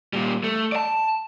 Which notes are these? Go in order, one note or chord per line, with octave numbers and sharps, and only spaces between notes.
A#2 G3
A3
D5 A5